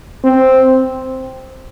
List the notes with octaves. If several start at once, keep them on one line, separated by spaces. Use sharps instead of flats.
C4